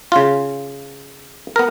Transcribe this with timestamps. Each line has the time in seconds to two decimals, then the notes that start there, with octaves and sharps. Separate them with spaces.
0.12 C#3 F4
1.56 B3 A#4